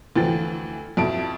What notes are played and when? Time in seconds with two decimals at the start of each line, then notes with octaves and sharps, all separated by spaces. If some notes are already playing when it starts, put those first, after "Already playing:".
0.16 D2 E3 F3 G5 A6
0.97 F2 B2 E4 A5 D7